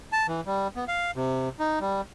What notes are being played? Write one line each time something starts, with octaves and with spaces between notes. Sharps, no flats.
A5
E3
G3
B3
F5
C3
D#4
G3